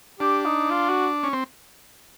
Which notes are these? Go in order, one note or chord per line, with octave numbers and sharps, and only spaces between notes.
D4 G4
D#4
F4
F#4
C#4
C4